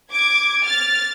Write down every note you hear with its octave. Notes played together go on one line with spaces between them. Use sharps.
D6 G#6
F6 A6